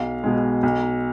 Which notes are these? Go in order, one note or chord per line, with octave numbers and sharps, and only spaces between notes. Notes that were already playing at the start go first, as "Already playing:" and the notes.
Already playing: B1 F5
B2 G#3
B1